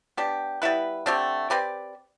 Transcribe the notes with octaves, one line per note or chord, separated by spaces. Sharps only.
B3 D4 G4
G3 B3 E4 B4
D3 A3 C4 G4
C4 G4 B4 D5